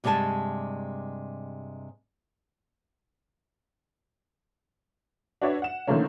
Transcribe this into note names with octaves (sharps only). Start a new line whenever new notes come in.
G2 C3 G3 G#3 G#5 A5
D4 F#4 B4 C#5 D5 E5
F#5 E7
D3 D#3 F3 A3 A#3 C#4